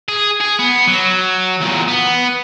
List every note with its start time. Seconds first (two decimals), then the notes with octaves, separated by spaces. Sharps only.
0.08 G#4
0.40 G#4
0.59 B3
0.87 F#3
1.61 E2 A#2
1.88 B3